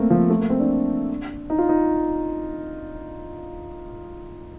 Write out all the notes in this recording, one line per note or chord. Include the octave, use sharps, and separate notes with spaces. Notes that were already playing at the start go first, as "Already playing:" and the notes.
Already playing: A3 A#3 C4
F3
A3
A#3
C4
D4
D#4
F4
D#4